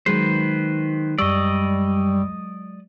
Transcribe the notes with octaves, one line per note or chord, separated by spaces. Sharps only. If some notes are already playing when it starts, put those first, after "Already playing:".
D#3 F#3 G#3 B4 C5
F#2 G3 D5 D#5 C#6 E6